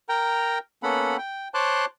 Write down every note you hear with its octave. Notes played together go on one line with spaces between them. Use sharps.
A#4 G5 A#5
A#3 B3 C#4 A4 F#5 B5
G5
C5 C#5 A5 C6 D6 F#6